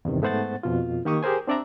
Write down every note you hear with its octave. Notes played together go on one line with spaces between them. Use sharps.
E2 G2 C3 D#3
G#2 A3 B3 C5 F#5 A6
F2 B2 F4
D#3 A#3 G4 F5 C#6 D#6
G4 G#4 A#4 C5 G#5
C4 D4 D5 E5 A#5